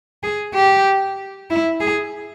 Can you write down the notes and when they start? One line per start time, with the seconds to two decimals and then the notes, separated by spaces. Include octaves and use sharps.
0.23 G#4
0.54 G4
1.50 E4
1.81 G#4